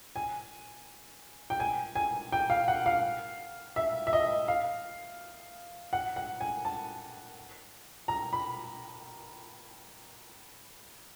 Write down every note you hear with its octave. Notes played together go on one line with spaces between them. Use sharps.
G#5
G5
G#5
G#5
G5
F5
F#5
F5
E5
E5
D#5
F5
F#5
F#5
G#5
A5
A#5
B5